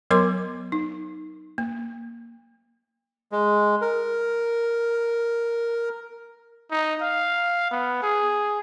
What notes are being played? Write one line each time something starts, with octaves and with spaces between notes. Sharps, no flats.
F#3 B3 A#4 C#5 C6 D6
D#4
A#3
G#3
A#4
D#4
F5
B3
G#4